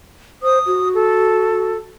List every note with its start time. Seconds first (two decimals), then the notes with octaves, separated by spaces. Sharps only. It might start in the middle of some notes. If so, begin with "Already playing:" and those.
0.43 C5 D#6
0.67 F#4
0.94 A4